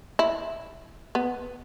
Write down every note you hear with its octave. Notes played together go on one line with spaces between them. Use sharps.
E4
B3